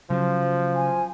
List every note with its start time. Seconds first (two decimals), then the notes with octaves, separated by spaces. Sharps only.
0.10 C#3 F3 F#3
0.75 G#5